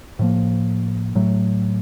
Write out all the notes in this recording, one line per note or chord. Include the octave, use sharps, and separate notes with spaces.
A2 F3 A#3
A2 F#3 A3